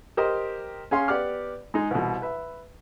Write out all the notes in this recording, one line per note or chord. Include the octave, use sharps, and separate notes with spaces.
G4 A#4 C5 D#5
C#4 G#4 F5 C6
B3 G4 D5 F#5 D6 F6
G#3 D#4 G#4
C2 B2
B4 E5